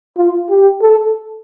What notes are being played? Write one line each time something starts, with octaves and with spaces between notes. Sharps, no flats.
F4
G4
A4